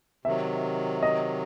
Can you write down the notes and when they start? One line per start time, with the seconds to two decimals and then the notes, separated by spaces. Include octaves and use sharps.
0.25 C3 D#3 F#3 E5
1.03 D#5